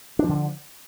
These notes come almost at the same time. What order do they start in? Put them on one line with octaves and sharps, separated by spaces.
D4 F3 D3